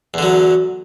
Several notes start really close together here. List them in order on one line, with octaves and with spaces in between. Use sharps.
E2 D3 F#3